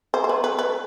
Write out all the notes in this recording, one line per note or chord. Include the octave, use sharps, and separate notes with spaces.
C5
C5
B4
B4
B4